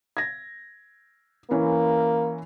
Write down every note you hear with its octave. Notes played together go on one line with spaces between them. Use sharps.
G#6 A#6
E3 A#3 C#4 E4